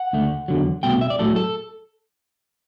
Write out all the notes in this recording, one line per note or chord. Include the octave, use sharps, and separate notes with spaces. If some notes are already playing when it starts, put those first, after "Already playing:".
Already playing: F#5
D2 D3 A3
E2 D3 F#3
C2 B2 A3 G5
E5
D5
A2 F#3 A3 A4
A4